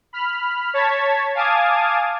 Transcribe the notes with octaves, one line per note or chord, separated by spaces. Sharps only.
B5 F6
C#5 A5 G#6 B6
F5 G#5 A5 D6 D#6 G#6